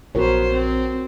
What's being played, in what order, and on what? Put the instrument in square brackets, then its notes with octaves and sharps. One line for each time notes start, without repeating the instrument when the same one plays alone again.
[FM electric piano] A#1 [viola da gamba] B3 C5 [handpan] F#4 A#4 C#5
[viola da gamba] C4